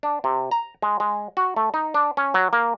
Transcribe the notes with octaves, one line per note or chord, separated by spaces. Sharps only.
D4
C3
A#5
G#3
G#3
F#4
A3
D#4
D4
C#4
F#3
A#3